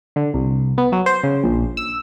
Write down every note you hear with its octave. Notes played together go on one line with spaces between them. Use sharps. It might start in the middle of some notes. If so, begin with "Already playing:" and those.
D3
C2
B3
F#3
C5
C#3
A#1
E6